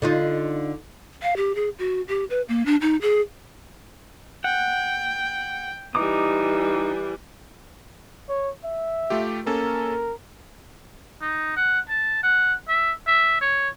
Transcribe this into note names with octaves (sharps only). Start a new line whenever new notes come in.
D3 D#4 F4
F5
G4
G#4
F#4
G4
B4
A#3
D4
D#4
G#4
F#5 G5
E3 G3 D#4 D6 D#6
C#5
E5
A3 F4 G4
A#3 C#4 A4 A#4
D#4
F#5
A5
F#5
E5
E5
C#5